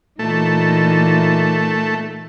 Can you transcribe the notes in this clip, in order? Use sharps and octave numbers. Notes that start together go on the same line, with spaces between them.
A#2 E3 A3 D#4